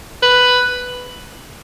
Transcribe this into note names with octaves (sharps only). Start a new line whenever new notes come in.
B4